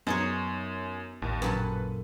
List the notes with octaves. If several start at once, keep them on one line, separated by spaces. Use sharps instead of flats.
F#2 B3 D#4 G#4 C#5
A1 D#2
F#2 A#2 A4 B4